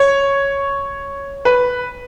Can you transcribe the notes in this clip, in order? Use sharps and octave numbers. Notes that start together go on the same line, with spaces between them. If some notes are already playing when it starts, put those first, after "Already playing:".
Already playing: C#5
B4